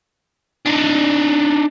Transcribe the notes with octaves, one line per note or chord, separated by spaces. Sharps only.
D4 D#4